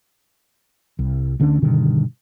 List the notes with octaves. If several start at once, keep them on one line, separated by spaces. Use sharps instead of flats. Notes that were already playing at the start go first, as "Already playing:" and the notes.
C2
D2 D3 C#4 D4
G2 B2 D3 D#3